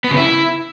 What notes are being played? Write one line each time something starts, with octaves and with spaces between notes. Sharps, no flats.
B3
C#3
E4